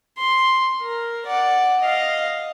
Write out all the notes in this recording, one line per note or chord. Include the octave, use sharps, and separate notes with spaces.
C6
A#4
D5 F#5
D#5 F5